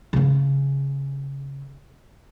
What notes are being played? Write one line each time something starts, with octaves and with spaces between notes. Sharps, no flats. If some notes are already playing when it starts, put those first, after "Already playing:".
C#3 C#4